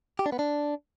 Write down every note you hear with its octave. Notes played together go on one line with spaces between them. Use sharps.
G4
D4
B3
D4